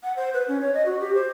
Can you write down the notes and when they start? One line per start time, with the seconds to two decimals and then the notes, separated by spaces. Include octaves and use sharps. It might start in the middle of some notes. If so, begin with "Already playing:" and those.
0.03 F#5
0.16 C5
0.34 B4
0.48 C#4
0.61 C#5
0.74 D#5
0.86 F#4
1.00 G4
1.15 C5